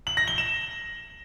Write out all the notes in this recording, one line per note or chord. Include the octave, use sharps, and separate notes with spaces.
F#7
A#6
G7
E7